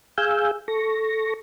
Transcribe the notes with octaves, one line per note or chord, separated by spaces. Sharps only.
G#4 F5 G#5 E6 G6
A4 C#6 A#6